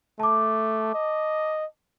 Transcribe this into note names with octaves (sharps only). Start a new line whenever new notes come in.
A3 A5 D6
D#5